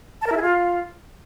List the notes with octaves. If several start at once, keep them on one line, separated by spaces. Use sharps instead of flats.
A5
A#4
E4
G#4
F4